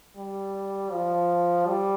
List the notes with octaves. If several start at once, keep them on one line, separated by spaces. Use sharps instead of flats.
G3
F3
G3